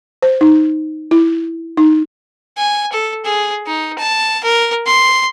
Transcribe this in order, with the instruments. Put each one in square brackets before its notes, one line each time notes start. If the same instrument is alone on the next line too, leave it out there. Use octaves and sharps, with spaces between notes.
[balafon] C5
D#4
E4
D#4
[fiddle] G#5
A4
G#4
D#4
A5
A#4
C6